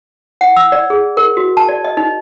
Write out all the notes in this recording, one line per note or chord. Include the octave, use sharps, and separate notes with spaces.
F#5
E6
D5
G#4
A#4
F#4
A5
D5
D#5
D#4